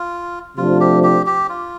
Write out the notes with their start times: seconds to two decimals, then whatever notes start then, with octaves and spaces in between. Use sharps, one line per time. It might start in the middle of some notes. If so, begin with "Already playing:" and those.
Already playing: F4
0.57 C3 F3 A3 D4 F4
0.80 G4
1.03 G4
1.26 G4
1.49 F4